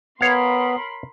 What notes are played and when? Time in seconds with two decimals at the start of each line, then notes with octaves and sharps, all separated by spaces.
0.21 B3 A#4 C#5 F5 B5 C6